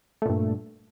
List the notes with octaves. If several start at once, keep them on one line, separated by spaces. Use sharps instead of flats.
G2 A#2 A3